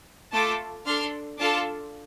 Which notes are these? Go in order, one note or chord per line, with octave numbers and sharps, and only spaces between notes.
A3 F4 A4 A5 D6
D4 A4 C6 F6
D4 F4 A4 A5 D6